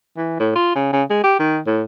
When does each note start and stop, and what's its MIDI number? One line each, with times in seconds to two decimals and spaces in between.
0.17 0.35 52
0.40 0.54 45
0.55 0.73 65
0.75 0.92 49
0.93 1.03 49
1.10 1.22 56
1.23 1.35 67
1.39 1.60 51
1.66 1.83 45